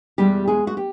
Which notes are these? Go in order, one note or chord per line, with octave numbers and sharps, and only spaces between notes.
E2 B2 G3 G#3 G4
G#3 G#4
F#4
G4